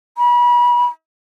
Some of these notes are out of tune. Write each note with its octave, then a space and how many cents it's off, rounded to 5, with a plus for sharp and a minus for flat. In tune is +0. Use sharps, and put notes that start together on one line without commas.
B5 -35